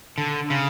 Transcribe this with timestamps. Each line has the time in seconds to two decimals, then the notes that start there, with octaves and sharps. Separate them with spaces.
0.18 D3
0.50 C#3